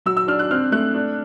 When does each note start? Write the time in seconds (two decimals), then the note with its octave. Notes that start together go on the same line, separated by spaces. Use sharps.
0.06 F#3 E6
0.17 E6
0.28 D4 F6
0.39 F#6
0.51 C4 F6
0.72 A3 F#6
0.95 D4